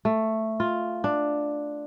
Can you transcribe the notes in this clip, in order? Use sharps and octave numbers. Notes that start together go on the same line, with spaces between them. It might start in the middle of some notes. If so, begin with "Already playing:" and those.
A3
F4
D4